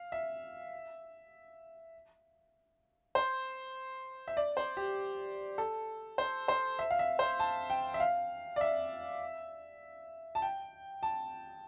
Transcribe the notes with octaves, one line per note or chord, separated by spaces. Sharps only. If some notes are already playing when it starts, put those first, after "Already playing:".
Already playing: F5
E5
C5
E5
D5
C5
G4
A4
C5
C5
E5
F5
E5
C5
A5
G5
E5
F5
D5
E5
A5
G5
A5